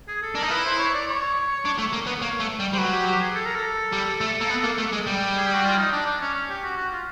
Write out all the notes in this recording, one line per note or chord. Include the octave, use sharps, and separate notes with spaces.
G#4
A4
D4 A#4
D#4
E4 B4
C5
C#5
D5
C#5
D4
A3
A#3
B3
A#3 C#5
A3
G3
G3 C5
F#3 B4
G4
G4
G#4
A4
A#4
A4
G3
A3
A#3
B3
A#3
A3
G#3
G3
G#4
G4
F#4
F4
D#4
D4
D4
C#4
C#4
G4
F#4
F#4
F4